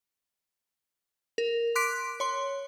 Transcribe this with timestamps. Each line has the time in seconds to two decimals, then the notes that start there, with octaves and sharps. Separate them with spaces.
1.38 A#4
1.75 C6 D6 F#6 B6 D7
2.20 C#5 C6